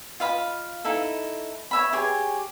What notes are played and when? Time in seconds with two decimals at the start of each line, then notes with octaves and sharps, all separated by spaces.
0.20 F4 D#5 F5 B5
0.85 D#4 E4 A4
1.71 C#5 E5 B5
1.93 G4 G#4 C#5